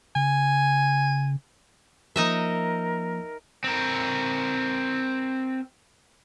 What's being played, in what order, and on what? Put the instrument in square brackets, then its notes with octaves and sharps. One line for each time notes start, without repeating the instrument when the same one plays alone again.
[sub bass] C#3 [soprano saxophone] G#5
[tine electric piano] F3 A#3 [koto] D#4 D#5 E5 [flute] A#4
[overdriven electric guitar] C4 A#4